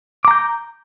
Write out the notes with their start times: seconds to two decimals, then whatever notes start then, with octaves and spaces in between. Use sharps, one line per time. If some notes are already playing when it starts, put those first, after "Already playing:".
0.25 D6
0.28 A#5
0.31 G6